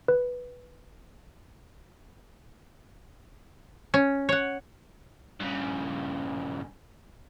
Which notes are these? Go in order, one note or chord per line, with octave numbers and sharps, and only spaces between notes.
B4
C#4
C#5 F#5
G2 C#3